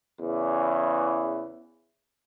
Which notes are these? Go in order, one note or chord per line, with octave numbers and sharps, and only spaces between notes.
E2 C#3 E3